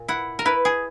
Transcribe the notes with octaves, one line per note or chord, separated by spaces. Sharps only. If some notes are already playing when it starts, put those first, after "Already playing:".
Already playing: A#2
E4 F#5
A#4
E4 B4
G#4